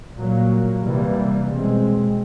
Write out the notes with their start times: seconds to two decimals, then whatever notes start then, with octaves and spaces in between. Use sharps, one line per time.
0.16 A#2 F#3 A#3
0.82 C3 E3 G3 A#3
1.48 B2 G#3 C4